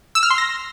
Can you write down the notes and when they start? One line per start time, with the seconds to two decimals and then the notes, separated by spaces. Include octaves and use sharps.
0.15 E6
0.23 F6
0.30 C6
0.38 A#6